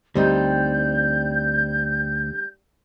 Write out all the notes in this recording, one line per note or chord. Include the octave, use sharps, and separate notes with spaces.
D2 G3 C4 D#4 G6